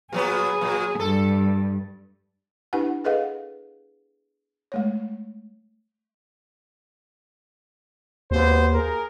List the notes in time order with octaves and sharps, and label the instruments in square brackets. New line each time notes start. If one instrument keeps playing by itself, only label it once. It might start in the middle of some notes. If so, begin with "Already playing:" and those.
[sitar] A#2 F#3 B3 [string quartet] G#4
[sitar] A#2 F#3
[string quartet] G2 [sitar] A4
[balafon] D4 E4 G4 B4 F#5 G#5
G#4 A4 B4 D#5 F5 F#5
G#3 A3 C#5
[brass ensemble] G#1 B3 C5 [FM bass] D#2
[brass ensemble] G#4 A#4